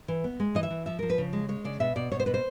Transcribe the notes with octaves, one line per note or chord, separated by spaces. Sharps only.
E3
B3
G#3
E3 D#5
E5
E3
F3 E5
F3 A#4
B4
C#3
G#3
G#3 C#5
C#3 D5
B2 E5
B2 D5
B2 C#5
C5
B2 B4
C5